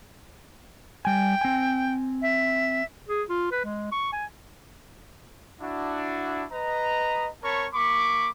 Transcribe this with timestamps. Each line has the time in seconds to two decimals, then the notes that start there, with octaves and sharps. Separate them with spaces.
1.05 G3 G5 G#5
1.41 C4 G#5
2.22 E5
3.08 G#4
3.29 F4
3.51 B4
3.65 G#3
3.92 C#6
4.13 G#5
5.61 D4 E4 F#4
6.52 B4 D#5 A#5
7.43 C4 A#4 C#5 A5 B5 C#6
7.74 A#3 B5 C#6 D6